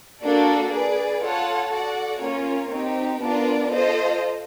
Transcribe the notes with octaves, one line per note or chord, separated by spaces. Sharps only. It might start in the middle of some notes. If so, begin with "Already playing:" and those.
A#3 D4 F#4 A4 D5
G#4 B4 D5
F4 A4 C#5 F#5 A5
F#4 A4 D5 F#5
A#3 C#4 F4 A#4 C#5
C4 D#4 G4
B3 D4 F4 A#4 D5
F4 A4 C5 D#5